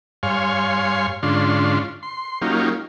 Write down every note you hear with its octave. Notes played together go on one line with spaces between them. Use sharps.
G2 C#5 F5 G#5 C6
G#2 D3 C#4 D4 F4 C6
C6
F#3 A#3 C#4 D#4 F4 G4